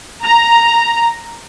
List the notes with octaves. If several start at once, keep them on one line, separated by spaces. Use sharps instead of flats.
A#5